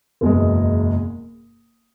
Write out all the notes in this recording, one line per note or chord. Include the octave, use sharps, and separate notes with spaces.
F#1 E2 B2 G#3